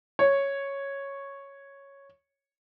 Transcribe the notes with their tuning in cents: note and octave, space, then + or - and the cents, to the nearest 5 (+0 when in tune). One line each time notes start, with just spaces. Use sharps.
C#5 -5